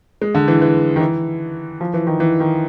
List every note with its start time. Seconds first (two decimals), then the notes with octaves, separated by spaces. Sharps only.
0.22 G#3
0.35 D3
0.48 E3
0.62 E3
0.96 D#3
1.01 E3
1.81 F3
1.94 E3
2.07 D#3
2.20 E3
2.40 D#3